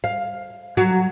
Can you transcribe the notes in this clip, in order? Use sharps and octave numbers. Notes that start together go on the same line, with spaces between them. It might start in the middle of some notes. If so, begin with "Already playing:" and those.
F5
F#3